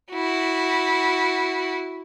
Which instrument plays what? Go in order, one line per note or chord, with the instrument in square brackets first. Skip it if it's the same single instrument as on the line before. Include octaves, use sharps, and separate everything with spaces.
[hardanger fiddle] E4 F#4